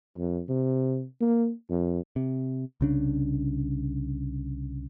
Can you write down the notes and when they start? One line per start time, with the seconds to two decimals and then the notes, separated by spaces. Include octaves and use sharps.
0.17 F2
0.48 C3
1.21 A#3
1.69 F2
2.16 C3
2.81 C2 C#3 D4